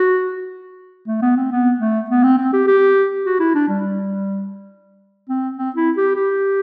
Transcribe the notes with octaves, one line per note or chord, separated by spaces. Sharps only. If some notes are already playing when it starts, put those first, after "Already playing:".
Already playing: F#4
A3
B3
C4
B3
A3
B3
C4
C4
G4
G4
F#4
E4
D4
G3
C4
C4
E4
G4
G4